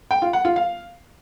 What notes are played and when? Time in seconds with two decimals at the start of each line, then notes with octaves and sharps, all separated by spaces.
0.11 G5
0.22 F4
0.33 F#5
0.45 F4
0.56 F5